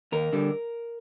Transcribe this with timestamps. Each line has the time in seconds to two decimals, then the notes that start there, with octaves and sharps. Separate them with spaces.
0.12 D#2 A#4
0.33 D3 G3